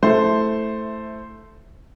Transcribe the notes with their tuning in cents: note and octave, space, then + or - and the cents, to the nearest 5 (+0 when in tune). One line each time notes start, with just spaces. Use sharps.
A3 +0 E4 -10 C5 +0